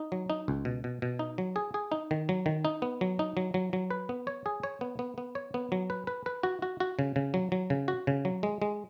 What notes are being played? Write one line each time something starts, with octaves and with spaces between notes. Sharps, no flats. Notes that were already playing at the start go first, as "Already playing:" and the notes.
Already playing: D#4
F#3
D#4
C#2
B2
B2
B2
D#4
F#3
G#4
G#4
D#4
D#3
F#3
D#3
D#4
B3
F#3
D#4
F#3
F#3
F#3
B4
B3
C#5
G#4
C#5
B3
B3
B3
C#5
B3
F#3
B4
B4
B4
F#4
F#4
F#4
C#3
C#3
F#3
F#3
C#3
F#4
C#3
F#3
G#3
G#3